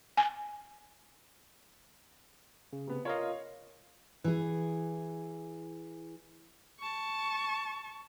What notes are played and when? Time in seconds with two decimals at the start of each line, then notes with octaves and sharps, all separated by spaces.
0.17 G#5
2.73 C#3
2.87 C3 B3
3.05 F4 A#4 C#5 D#5 F5
4.24 E3 G#4
6.79 A5 C#6